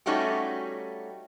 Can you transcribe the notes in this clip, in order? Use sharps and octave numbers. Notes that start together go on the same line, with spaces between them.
G3 A3 C#4 D#4 F#4 G4